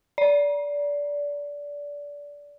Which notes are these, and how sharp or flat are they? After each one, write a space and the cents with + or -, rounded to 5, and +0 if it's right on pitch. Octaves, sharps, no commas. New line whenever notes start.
D5 -20